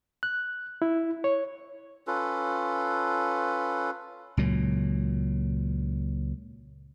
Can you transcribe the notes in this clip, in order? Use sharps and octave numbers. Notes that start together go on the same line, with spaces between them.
F#6
E4
C#5
C#4 F4 A4 B4
C#2 A#2 F#3